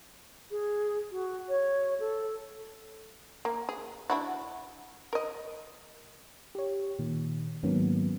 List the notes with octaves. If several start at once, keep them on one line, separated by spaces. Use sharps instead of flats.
G#4
F#4
C#5
A4
A#3
G#4
D4 E4 F#4
A#4 D#5
G4 C#5
A#2 D#3
G#2 D#3 F#3 A#3 B3 C#4